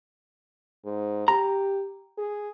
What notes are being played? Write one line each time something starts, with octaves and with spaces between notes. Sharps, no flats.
G#2
G4 A#5
G#4